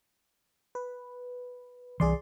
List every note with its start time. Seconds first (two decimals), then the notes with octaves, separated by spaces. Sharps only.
0.75 B4
2.00 C2 E3 G#4 D5 C6